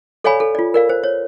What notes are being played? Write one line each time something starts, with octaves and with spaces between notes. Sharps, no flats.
A4 C#5 D5 F5 G#5 B5
A4
F4 D5
A#4 D5 F5
C5
C#5